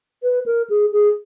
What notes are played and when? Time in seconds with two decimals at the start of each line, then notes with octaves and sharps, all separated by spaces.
0.23 B4
0.46 A#4
0.70 G#4
0.92 G#4